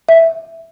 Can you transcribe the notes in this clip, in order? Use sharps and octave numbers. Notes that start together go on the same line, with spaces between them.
E5